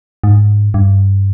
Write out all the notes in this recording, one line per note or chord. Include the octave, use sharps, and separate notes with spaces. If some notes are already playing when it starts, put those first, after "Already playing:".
G#2
G2